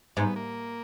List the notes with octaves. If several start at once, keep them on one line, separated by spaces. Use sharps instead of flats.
G#2 B3
A#3